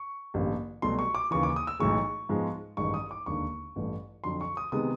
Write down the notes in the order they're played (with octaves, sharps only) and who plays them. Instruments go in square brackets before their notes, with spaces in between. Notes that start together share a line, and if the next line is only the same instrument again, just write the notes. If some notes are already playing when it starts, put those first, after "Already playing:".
Already playing: [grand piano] C#6
A1 G2 D3 G3 A#3
C2 B2 F#3 A3 C6
C#6
D6
D#2 C#3 E3 C#6
D6
D#6
E6
B1 A2 E3 G#3 C#6
G#2 F3 G#3 B3
A1 G2 D#3 G#3 C#6
D#6
D6
E1 D#2 D3 C#6
A1 G2 E3 A3
F2 D3 F#3 C6
C#6
D#6
C3 D#3 G#3 B3 D#6